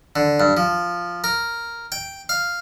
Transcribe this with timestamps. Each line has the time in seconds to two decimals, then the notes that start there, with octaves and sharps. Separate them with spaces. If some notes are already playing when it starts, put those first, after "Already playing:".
0.16 D3
0.40 G2
0.57 F3
1.24 A#4
1.92 G5
2.29 F5